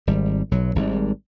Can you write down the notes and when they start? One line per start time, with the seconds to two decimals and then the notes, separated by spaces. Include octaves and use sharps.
0.07 G#1 G3
0.51 B1 F#3
0.76 G#1 G#2 G3